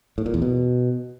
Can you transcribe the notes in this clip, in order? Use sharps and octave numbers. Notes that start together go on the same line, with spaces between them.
A2
A#2
E2
B2